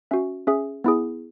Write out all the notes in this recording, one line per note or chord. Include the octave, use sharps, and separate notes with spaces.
C#4 F#4 E5
C#4 G#4 E5
B3 E4 G#4